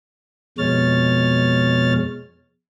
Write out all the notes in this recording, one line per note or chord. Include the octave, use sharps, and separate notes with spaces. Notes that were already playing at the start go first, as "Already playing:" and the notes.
F2 B2 G#3 C#5 F6 A6